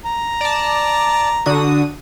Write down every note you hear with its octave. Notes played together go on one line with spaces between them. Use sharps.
A#5
D5 A5
D3 F#4 D#6